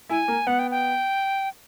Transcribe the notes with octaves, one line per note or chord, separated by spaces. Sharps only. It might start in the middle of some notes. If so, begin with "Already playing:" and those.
E4 G#5
A#3
B3 F#5
G5
G5